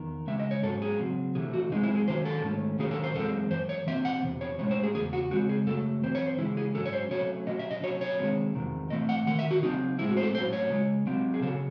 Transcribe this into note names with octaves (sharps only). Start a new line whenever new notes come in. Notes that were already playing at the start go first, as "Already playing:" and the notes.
Already playing: E2 D#3
C#3 G#3 C#4 E5
D#5
C#5
G#2 F#3 C#4 A4
G#4
C#3 F#3 C4
C3 E3 A3 G#4
F#4
F#2 E3 G#3 C4 D#4
E4
G#4
C3 D#3 F#3 C#4 C5
A4
G#2 D#3 A3 C#4
C3 D#3 F#3 C#4 G#4
A4
C5
F#2 E3 G#3 C4 A4
F#2 E3 C5
C#5
C3 E3 C4 E5
F#5
E2 C3
C#5
A2 G#3 C#4 C#5
C5
G#4
E2 C#3 G#4
F#4
C#3 G#3 C4 F#4
G#4
F#2 C#3 F#3 A3 A4
F#2 E3 C4 C5
C#5
C5
C#3 E3 G#3 E4
G#4
G#2 D#3 F#3 C#4 A4
C#5
C5
C3 F#3 A3 C#4 C#5
C3 F#3 C#4 D#5
E5
D#5
C3 F#3 C#4 C#5
C#5
C3 D#3 G#3 C4
E2 C3 D#3
A2 E3 A3 C4 D#5
F#5
C3 D#3 F#5
E5
F#4
C#3 F#3 C4 D#4
A2 G#3 C4 E4
F#4
C5
A4
A2 F#3 C#4 C5
C#5
C#3 G#3 C#4
C3 F#3 C4
G#4
C#3 F#3 C#4 A4